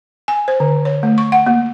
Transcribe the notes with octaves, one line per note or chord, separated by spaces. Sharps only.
G#5
C5
D3
C#5
A3
C#6
F#5
A#3